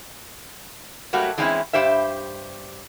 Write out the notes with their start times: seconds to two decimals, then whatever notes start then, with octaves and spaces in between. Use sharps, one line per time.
1.13 F#3 G3 A3 A#3 F#4
1.38 E3 G#3 C4 C#4 D#4 E4
1.73 G2 G4 C5 E5